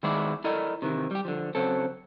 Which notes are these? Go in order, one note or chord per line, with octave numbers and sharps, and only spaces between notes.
D#3 G#3 B3 E4 G#4 D5
E4 A4 A#4 D5 D#5
C3 D#3 E3
G3 G4
D3 F3
C#3 F#3 C4 A4